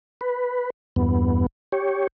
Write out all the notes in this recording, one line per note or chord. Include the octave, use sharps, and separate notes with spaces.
B4
E2 G2 B3
G4 C#5